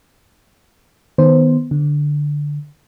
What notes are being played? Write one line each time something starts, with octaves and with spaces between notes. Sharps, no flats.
D#3 B3 C5
D3